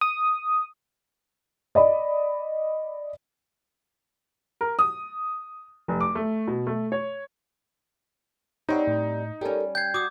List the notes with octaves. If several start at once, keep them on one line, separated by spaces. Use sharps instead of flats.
D#6
D5 D#5 B5
A#4
D#6
F1
D6
A3
B2
A3
C#5
G3 C4 D#4 C5 C#5 F#5
A2
G3 C#4 G4 A4 A#4
G5 G6 G#6 C7
F#4 D6 D#6